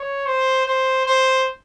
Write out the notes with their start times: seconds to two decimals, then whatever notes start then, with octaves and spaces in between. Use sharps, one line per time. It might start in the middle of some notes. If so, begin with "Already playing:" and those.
Already playing: C#5
0.26 C5
0.66 C5
1.06 C5